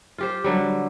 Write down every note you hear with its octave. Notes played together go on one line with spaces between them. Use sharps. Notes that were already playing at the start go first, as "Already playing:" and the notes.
F4 G4 C5
D3 F#3 G3